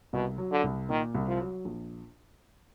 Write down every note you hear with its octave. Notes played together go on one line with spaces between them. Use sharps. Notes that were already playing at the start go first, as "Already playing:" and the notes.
C2 B2
F#3
D3
C2
A#2 D#3
C2
F3
F#3
A#1